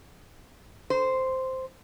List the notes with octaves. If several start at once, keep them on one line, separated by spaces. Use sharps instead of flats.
C5